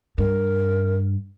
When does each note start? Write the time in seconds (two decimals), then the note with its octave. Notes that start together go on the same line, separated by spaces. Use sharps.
0.18 G2 A#4